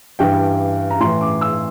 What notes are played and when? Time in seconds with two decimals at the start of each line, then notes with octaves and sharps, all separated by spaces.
0.19 G2 E3 G5
0.91 A#5
1.00 A2 E3 C6
1.21 D6
1.41 E6